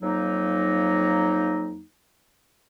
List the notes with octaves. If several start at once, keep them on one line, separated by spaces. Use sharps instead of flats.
F2 F#3 A#3 D#4